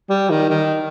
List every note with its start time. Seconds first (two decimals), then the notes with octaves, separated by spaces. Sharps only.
0.09 G3
0.30 D#3
0.50 D#3